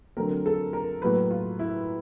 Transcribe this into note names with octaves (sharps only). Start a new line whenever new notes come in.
D3 F#3 A3 C4 A#4
A4
A#4
A2 F#3 A#3 B4
F4
E4